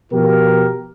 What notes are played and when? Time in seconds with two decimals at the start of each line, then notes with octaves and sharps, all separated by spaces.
0.12 B2 F3 F4 G4 A#4